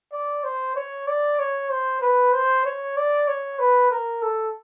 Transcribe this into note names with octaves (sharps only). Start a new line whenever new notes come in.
D5
C5
C#5
D5
C#5
C5
B4
C5
C#5
D5
C#5
B4
A#4
A4